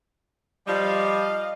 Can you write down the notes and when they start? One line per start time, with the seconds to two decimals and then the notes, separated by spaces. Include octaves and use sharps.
0.67 F3 G3 D#5 F5